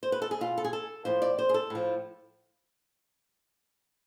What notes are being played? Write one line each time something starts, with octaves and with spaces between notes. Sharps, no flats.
C5
B4
A4
G#4
B2 F4
A4
G#4
A4
A2 F3 C5
D5
C5
G#4
A4
A2 F3